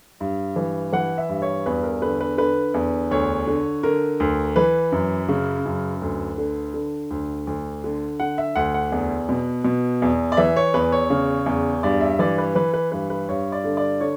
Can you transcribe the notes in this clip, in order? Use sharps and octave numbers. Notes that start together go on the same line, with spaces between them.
G2
E3
E3 F#5
E5
G2
C#5
E2 B4
A#4
D3 B4
B4
D3 B4
E2
D2 C#5
D3
D3 A#4
D2
E3 B4
F#2
C#3
F#2
D2
D3
D3
D2
D2
D3
D3 F#5
E5
D2 F#5
F#5
E2
B2
B2
E2
D5
E3 E5
C#5
E2 B4
C#5
C#3
E2
G2 D5
E5
E3 D5
B4
E3 B4
B4
G2 B4
B4
G2 C#5
D5
D3
D5
D3 C#5